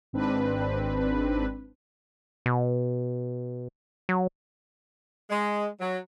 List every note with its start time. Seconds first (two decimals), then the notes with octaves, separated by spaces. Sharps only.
0.13 G#1 G#2 C4 D4 B4
2.46 B2
4.09 F#3
5.30 G#3
5.81 F#3